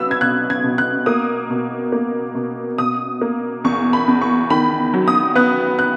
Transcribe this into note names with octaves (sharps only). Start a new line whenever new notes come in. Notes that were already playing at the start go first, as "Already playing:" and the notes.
Already playing: F#3 B3 E6 F#6
G#6
B2 F#6
G#6
B2
F#6
A#3 D#6
B2
A#3
B2
B2 D#6
A#3
E2 C#6
B5
E2
C#6
D#3 B5
F#3
D#6
B3 F#6
F#6